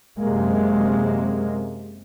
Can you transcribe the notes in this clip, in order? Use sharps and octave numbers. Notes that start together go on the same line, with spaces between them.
F#2 C3 G#3 A#3